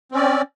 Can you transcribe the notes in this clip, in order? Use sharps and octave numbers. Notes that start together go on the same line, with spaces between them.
C4 C#4 D5